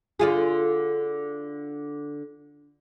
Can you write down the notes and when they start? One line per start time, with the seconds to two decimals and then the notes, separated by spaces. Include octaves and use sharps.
0.19 D3 F4 G#4